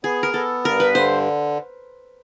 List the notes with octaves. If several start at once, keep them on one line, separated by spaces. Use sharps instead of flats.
B3 G#4
A#4
B3 A4
G2 A#4
B4
D3 C5